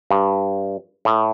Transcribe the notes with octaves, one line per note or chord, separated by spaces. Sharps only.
G2
A2